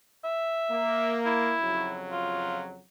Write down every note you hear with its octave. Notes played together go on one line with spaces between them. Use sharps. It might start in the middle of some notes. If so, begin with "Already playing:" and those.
E5
A#3
E4
F2 C#3 F#3
F4